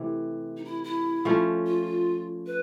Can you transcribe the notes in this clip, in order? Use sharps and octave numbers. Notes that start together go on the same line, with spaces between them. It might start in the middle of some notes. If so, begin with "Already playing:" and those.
Already playing: C3 E3 A3
D#4
E4
E4
F3 A3 C#4
F4
B4